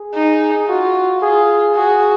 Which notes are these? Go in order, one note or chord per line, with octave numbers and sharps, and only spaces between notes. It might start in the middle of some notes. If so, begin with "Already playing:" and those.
Already playing: G#4
D#4
F4 F#4
F4 G#4
F#4 G#4